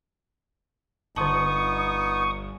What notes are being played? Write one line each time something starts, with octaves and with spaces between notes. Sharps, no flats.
G1 D3 B3 D#4 A5 C#6 D#6